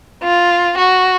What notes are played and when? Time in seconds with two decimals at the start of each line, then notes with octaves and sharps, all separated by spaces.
0.23 F4
0.77 F#4